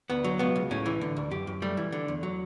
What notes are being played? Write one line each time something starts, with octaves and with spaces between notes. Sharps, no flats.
D2 B3
F#3
C#2 B3
C#2
A2 C#4
E3
D3
D2
F#2 G4
F#2
G3 A3
E3
D3
E2
F#3